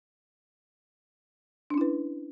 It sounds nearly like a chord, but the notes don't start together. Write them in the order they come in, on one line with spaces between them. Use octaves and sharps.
D4 C#4 E4 B4